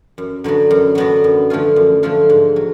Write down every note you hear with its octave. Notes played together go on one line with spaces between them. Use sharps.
F#2
D3 F#3 B3 F#4
F#2
D3 F#3 B3 F#4
F#2
D3 F3 A3 F4
F#2
D3 F3 A3 F4
G#2
F#3